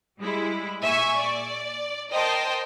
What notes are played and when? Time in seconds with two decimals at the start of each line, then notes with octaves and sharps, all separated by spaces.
0.20 G3 G#3 E4
0.81 A#2 E5 G#5 C#6
1.18 D5
2.11 A#4 C5 D#5 G5 A5 C6